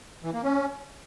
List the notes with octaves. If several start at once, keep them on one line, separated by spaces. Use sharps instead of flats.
E3
A#3
C#4